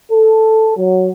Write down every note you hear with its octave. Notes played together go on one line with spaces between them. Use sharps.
A4
F#3